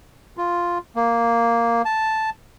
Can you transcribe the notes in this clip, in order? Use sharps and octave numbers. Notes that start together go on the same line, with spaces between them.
F4
A#3
A5